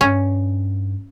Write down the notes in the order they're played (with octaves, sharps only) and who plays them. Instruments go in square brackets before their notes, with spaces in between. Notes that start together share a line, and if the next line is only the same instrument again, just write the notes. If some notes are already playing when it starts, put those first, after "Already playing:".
[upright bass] G2 [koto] C#4